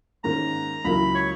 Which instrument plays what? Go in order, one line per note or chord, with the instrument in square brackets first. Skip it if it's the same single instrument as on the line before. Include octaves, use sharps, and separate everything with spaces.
[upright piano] G#2 D#3 A#3 C#4 [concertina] A#5
[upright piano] C#2 C#3 F#3 A#3 E4 [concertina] B5
[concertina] C#5